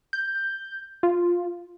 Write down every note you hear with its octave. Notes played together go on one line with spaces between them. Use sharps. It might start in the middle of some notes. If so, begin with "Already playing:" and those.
G6
F4